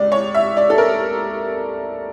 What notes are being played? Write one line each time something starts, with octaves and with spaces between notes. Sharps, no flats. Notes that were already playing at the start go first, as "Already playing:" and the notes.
Already playing: C#2 D5
C#5
E5
D5
A4
A#4